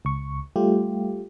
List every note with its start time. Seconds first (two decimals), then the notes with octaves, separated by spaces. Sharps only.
0.05 C#2 C#6
0.56 G3 A3 F4 G4